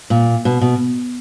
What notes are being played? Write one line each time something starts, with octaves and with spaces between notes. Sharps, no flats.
A#2
B2
B2